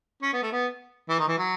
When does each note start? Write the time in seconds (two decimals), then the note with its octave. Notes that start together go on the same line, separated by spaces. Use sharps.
0.22 C#4
0.33 B3
0.42 A3
0.52 B3
1.09 E3
1.19 D#3
1.28 E3
1.38 F#3